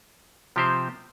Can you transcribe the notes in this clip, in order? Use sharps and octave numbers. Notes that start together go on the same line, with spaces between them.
C3 F3 C4 G4 C5